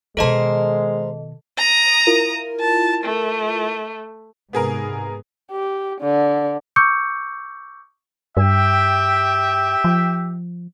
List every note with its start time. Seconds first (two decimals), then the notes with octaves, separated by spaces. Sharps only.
0.17 B2 D#3 G#3 A4 A#4 C5 D#5 A5
1.58 A#5 D#6
2.07 E4 F4 A#4
2.60 A5
3.04 A3
4.53 G#2 C3 B3 G#4 A#4
5.52 G4
6.01 D3
6.76 C#6 D6 E6 G6 C#7
8.37 G2 G4 E5 G5
9.84 F3